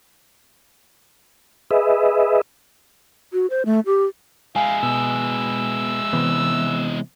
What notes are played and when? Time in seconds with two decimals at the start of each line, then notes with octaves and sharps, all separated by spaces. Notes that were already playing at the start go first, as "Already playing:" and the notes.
1.71 G#4 B4 D#5 E5
3.32 F#4
3.50 C5
3.65 A3
3.86 G4
4.56 G#3 E4 F5 G#5
4.83 B2 E6
6.13 C3 E3 B3